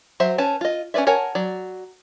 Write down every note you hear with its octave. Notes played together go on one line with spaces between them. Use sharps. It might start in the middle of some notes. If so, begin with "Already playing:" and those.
F#3 C5 E5
C#4 B4 A5
F4 D#5
C#4 G#4 B4 D5 E5
A#4 C#5 F#5 G#5 A5
F#3 D5